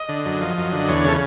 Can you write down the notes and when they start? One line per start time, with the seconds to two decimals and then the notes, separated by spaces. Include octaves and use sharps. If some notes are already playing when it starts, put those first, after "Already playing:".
Already playing: D#5
0.09 D3
0.26 F#2
0.41 F3
0.57 F#2
0.72 D3
0.89 E2 C#5
1.04 C#3 A4